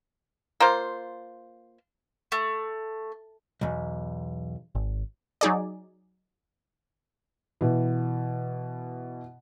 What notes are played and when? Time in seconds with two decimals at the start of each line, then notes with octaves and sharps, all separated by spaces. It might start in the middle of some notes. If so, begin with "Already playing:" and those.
0.60 A#3 F4 C5
2.32 A3
3.61 B1 E2
4.75 G#1
5.41 F#3 D#4 G#4 D5
7.61 B2 E3